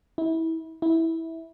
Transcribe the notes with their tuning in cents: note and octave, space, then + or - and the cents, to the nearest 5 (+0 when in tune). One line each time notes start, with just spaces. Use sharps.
E4 -25
E4 -15